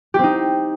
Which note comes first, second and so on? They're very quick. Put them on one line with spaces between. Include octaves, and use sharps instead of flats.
G4 C4 D#4